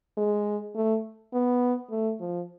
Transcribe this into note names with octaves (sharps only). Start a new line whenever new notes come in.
G#3
A3
B3
A3
F3